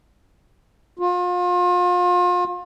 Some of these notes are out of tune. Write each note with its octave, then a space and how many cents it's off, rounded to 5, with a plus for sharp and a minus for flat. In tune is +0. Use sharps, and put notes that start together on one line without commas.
F4 +35